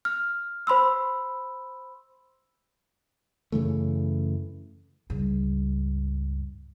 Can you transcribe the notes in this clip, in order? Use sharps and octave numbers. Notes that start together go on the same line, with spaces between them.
F6
C5 B5 C6 E6
F#2 C#3 E3 A3
C#2 G2